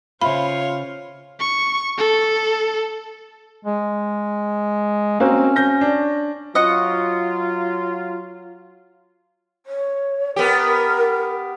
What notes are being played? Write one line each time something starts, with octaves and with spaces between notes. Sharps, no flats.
C#3 F4 C5 C#5 E5 F5 B5
C#6
A4
G#3
A#3 C4 C#4 F#4
G6 A#6
D4
F#3 F4 D#5 F#5 C#6
C#5
B3 G4 A#4